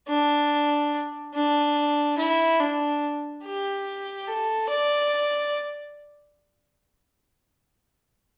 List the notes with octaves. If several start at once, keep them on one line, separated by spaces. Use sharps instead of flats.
D4
D4
E4
D4
G4
A4
D5